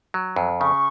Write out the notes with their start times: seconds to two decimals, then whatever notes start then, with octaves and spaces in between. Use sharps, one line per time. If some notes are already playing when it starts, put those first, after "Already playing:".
0.14 F#3
0.36 F2
0.60 C#3 C#6